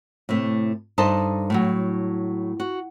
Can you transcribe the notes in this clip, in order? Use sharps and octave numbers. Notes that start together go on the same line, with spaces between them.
A2 C3 A3
G2 D#4 A4 C5 D#5 A5
A2 F#3
F#4